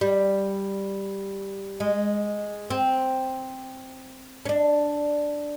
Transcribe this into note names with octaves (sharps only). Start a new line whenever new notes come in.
G3
G#3
C4
C#4
D4